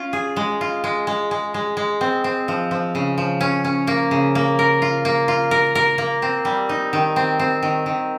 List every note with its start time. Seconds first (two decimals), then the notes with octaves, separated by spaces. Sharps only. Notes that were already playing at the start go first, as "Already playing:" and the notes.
Already playing: C#4 F4
0.13 G#4
0.36 G#3
0.61 F4
0.84 G#3
1.07 G#3
1.31 G#3
1.54 G#3
1.77 G#3
2.01 C4
2.24 C4
2.48 F3
2.71 F3
2.95 C#3
3.18 F3
3.41 C#4
3.64 C#4
3.87 A#3
4.11 C#3
4.35 A#3
4.59 A#4
4.82 F4
5.05 A#3
5.28 F4
5.51 A#4
5.75 A#4
5.98 A#3
6.22 C4
6.45 G3
6.69 D#4
6.93 D#3
7.16 C4
7.39 C4
7.62 D#3
7.86 D#3